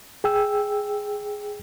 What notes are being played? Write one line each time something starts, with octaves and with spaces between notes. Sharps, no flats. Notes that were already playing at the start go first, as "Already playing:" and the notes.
G#4 G5 E6